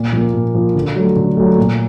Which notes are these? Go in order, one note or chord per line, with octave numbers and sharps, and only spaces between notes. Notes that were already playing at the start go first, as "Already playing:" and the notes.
Already playing: A#2
F3 A#3
A#2
F3 A#3
D3
F#3 A3
D3
F#3 A3
A#2